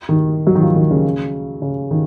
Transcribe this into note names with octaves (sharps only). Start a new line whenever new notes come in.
D#3
F#3
D#3
F3
D#3
C#3
C#3
D#3